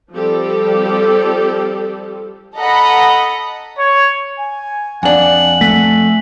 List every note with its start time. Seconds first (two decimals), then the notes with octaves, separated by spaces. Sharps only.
0.12 F3 G3 C4 G4 A4
2.57 A4 D#5 F#5 A#5 B5
3.78 C#5
4.38 G#5
5.03 F2 D4 F#5 G#5 F#7
5.61 A3 B6